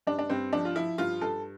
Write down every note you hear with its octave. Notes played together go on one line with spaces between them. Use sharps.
G2 D4
D4
G2 C4
F3 D4
F4
F3 E4
G2 F4
G2 A4